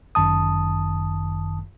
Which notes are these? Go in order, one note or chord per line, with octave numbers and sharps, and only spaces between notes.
G1 F#2 D#3 A5 D#6